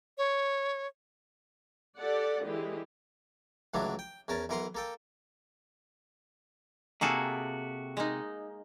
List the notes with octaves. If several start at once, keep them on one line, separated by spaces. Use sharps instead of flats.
C#5
G4 A4 D5 F#5
D3 E3 G#3 G4
C#2 A2 D3 E3 F#3 D4
G5
E2 C#4 A#4 A5
B1 E3 A#4 B4 F#5 C6
A#3 A4 G5
C3 A#3 F#4 G#4 A4
G#3 A#3 D#4